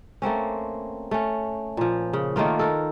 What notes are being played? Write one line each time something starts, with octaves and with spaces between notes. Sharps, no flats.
A3 A#3 C4 C#4
A3 C#4
A#2 F3
C#3
D#3 A3 A#3 F4
A4 A#4